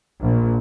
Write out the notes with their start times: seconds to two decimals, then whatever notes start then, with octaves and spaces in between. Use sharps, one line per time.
0.22 A#1